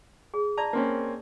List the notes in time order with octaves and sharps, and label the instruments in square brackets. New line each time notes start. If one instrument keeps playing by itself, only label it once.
[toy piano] G#4
[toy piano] D5 A5 [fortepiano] A#5
[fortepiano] A#3 C4 C#4